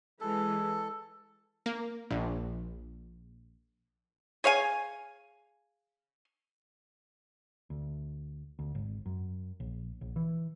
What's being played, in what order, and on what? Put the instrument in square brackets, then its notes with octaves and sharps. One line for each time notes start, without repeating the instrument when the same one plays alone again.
[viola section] E3 G#3 [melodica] A4
[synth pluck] A#3
A#1
[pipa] G#4 C#5 F5 G#5
[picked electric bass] D2
D2
G#1
F#2
A#1
A#1
E3